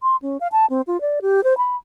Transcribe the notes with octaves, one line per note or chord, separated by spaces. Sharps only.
C6
C#4
F5
A5
C4
F4
D5
G4
C5
B5